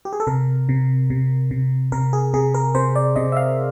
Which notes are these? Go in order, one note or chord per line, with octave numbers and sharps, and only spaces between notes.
G4
G#4
A4
C3 A#4
C3
C3
C3
C3 A#4
G#4
C3 G#4
A#4
C3 C5
D5
C3 D#5
E5
F5